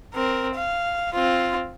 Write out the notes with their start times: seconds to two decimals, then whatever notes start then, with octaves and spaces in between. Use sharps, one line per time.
0.14 C4 A#4
0.55 F5
1.14 C4 F4